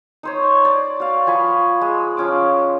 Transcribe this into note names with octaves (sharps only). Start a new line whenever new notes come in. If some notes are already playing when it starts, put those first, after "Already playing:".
D#4 C5 C#5
D5
F#4 F5
F3 G#5 B5 C#6
G#3
F3 C#4 D6